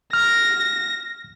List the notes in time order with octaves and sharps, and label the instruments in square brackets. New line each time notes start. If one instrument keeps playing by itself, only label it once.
[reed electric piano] F6 [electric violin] A#6